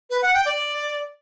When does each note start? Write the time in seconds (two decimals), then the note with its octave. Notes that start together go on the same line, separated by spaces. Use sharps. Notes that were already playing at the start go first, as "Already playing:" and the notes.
0.10 B4
0.22 F#5
0.34 G5
0.46 D5